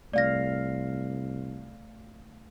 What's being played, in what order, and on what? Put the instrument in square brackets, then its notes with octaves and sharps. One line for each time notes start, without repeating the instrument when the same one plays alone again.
[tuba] C2 [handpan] A3 F5 [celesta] D5 A#6